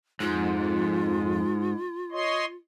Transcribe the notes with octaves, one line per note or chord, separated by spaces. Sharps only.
F2 G#2 F4
C#5 D#5 C6